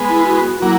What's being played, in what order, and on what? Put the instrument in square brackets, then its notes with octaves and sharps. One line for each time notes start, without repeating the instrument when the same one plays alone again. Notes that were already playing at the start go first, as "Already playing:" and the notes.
Already playing: [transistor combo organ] G#3 B3
[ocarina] E4
F#4
[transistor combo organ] F#3 A#3 [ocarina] E4